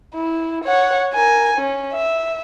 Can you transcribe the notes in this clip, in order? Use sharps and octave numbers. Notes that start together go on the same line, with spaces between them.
E4
C#5 F#5
A#4 G#5
C#4
E5